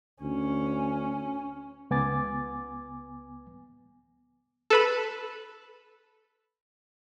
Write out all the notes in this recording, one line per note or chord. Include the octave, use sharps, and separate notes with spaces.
D2 C#4
C#2 B3 G#5 D6 A6
A4 B4 B5